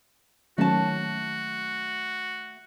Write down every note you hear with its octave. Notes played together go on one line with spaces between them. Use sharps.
D#3 F#3 A3 C#4 F#4 A5